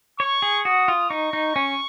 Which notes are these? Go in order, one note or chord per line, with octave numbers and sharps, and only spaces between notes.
C#5 C#6
G#4
F#4 D#6
F4
D#4 C#6
D#4
C#4